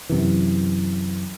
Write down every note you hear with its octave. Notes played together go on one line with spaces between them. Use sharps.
F#2 C3 E3